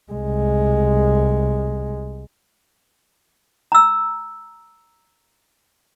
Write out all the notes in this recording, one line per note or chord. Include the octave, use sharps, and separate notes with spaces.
C2 G#3
A#5 E6